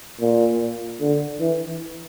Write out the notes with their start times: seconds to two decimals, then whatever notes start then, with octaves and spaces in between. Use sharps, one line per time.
0.21 A#2
1.01 D3
1.40 E3